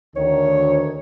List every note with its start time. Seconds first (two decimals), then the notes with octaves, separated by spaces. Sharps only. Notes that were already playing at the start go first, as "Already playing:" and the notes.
0.16 D2 D#3 C#5